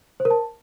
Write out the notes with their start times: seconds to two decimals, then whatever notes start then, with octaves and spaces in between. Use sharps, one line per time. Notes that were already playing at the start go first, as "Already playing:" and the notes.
0.20 C5
0.25 A#4
0.31 A5